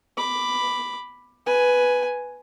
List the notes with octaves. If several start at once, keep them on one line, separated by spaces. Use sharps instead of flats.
B5 D6
B4 G#5